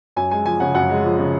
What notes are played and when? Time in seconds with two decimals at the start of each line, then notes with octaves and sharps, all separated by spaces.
0.16 F#2 G#5
0.31 G#3 G#5
0.46 F3 G#5
0.60 C#3 F#5
0.75 F#2 F#5
0.90 G#3
1.04 F3
1.18 C#3